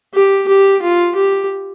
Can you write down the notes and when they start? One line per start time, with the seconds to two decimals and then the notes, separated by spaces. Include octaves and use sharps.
0.14 G4
0.48 G4
0.82 F4
1.15 G4